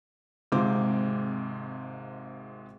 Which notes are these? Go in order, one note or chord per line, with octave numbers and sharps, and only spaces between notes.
G#1 G#2 C3 F4 C5 D6